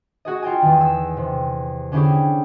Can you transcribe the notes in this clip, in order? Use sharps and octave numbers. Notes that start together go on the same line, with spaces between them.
F#4 G#4 D#5
F4 G5 G#5
E2 D#3
E6
C3
D3 C#4 E4 G4 G#4